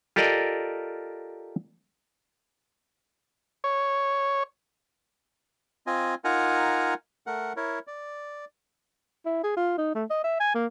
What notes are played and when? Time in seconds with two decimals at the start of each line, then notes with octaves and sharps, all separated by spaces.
0.16 F4 G4 A4 A#4 D5 D#5
3.64 C#5
5.87 C4 F4 D#5 G#5
6.24 D#4 F4 A#4 F#5 G#5 A#5
7.27 A3 A#4 F#5
7.57 E4 A#4 C#5
7.87 D5
9.26 E4
9.44 G#4
9.57 F4
9.78 D#4
9.95 A3
10.10 D#5
10.24 E5
10.40 G#5
10.54 A#3